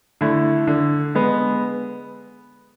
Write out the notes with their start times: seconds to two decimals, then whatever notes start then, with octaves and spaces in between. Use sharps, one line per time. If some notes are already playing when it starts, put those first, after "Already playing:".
0.21 D3 A3 E4
0.67 D3
1.15 G#3 B3